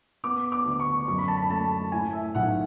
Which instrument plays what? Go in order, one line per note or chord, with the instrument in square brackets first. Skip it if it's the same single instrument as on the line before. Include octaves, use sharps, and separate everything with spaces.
[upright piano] B3 D6
D6
D2
C#6
F#2 C#6
B5
A5
B5
A3 A5
A2 G#5
E5
B1 F#5